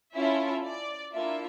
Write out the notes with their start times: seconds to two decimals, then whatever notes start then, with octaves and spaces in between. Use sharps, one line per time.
0.14 C#4 E4 F4 A4 E5
0.65 D5
1.13 A#3 D4 E4 F4 A4 E5